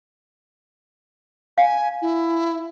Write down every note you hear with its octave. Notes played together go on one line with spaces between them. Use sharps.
F5 G#5
E4